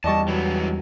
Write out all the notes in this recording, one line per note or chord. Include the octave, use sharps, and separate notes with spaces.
E2 G3 D5 D#5 A5 C#6
E3 F#3 G#3 B3